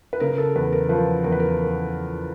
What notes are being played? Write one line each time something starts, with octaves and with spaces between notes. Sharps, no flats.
B4
C#3 A#4
A4
E2 B4
A#4
F3 B4
E2 A#4
B4
A#4